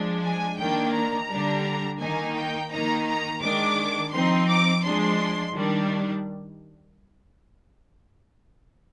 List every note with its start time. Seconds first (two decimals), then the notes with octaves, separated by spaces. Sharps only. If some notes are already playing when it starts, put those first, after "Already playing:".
Already playing: F3 G#3 D4
0.23 G#5
0.58 D#3 A#3 D4 G5
0.94 A#5
1.30 D3 G3 D4
2.00 D#3 A#3 D#4 G#5
2.36 G5
2.71 D#3 A#3 D#4 A#5
3.07 A#5
3.41 D#3 G#3 D4 D6
4.12 F3 C4 D#4 C6
4.49 D6
4.84 F3 G#3 D4 C6
5.54 D#3 G3 D4